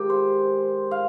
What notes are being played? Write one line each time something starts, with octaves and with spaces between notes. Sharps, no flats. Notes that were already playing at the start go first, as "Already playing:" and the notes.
Already playing: G#2 D#3 G#3 G4
C5
F5